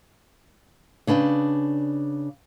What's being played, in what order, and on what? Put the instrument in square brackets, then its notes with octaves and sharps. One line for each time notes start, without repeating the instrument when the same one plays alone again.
[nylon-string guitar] C#3 D4 B4 F5 G5